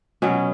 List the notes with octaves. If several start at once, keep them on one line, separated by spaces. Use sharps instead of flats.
B2 F#3 C#4